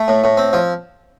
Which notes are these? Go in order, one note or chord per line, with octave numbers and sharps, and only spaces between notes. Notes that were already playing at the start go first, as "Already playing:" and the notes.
Already playing: A3
A2
A2
C4
F3